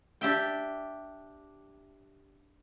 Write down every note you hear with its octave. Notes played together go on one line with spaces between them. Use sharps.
D4 G4 E5 G5